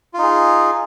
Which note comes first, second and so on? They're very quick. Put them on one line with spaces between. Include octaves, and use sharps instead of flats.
F4 D#4 G#4